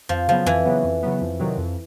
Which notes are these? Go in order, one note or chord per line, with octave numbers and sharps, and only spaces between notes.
F2 F3
C#3 F3 F#3 B3
F2 E3
C#3 F#3 B3
F2
C#3 F#3 B3
F2
C3 D#3 F#3
F2